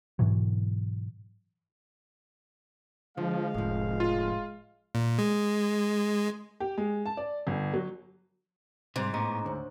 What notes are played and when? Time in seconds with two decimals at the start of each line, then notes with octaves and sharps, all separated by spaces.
0.19 G#2 B2 E3 F#3
3.17 D3 F3 G#3 F5
3.54 F1 A2 F3
4.00 F4
4.95 A#2
5.19 G#3
6.60 G4
6.78 G#3
7.06 A5
7.17 D5
7.47 G1
7.73 F#3
8.96 G#2 C3 G3 C6
9.13 A2 B3 C#4 D#5 A#5 D6
9.45 D2 D4 C5 C#5